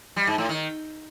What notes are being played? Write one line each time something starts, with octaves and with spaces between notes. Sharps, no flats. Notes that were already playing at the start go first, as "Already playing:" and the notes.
G3
G#2
A2
D#3